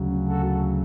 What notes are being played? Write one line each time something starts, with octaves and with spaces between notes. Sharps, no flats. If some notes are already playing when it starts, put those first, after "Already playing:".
Already playing: D2 C#3 F#3
F#4 A4